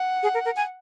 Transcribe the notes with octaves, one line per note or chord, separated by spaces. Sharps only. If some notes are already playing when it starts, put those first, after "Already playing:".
Already playing: F#5
G#4
A#4
A#4
G#5